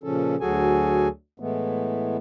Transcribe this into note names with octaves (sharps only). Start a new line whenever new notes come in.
A#2 C#3 F3 C#4 A4
D2 F#3 F#4 G#4 A4 G#5
A2 E3 G#3 A3 B3